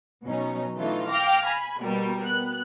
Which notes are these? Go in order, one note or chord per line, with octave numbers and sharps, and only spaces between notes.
B2 F#3 C#4 D#4
E3 A3 C#4 D#4 F4
F5 G5 D6 F6 A#6
G#5 B5
B2 G3 A#3 A#4
B3 F#6